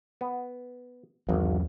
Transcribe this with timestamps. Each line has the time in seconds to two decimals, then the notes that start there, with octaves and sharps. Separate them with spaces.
0.21 B3
1.29 G#1 E2 F#3